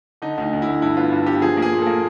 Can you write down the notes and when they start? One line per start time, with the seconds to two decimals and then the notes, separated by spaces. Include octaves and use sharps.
0.22 D3 D#4
0.38 D2 D#4
0.53 D2
0.62 E4
0.67 D2
0.82 G2 E4
0.97 B3 F4
1.12 G2
1.26 B3 G4
1.42 F3 G#4
1.57 A#3
1.62 G#4
1.72 A#2
1.82 A#3 A4